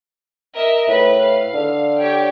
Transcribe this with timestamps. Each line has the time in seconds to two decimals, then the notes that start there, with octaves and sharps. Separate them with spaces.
0.55 A#4 D#5 E5
0.88 A2 B4
1.19 F5
1.54 D3
1.99 G4 C#5 G5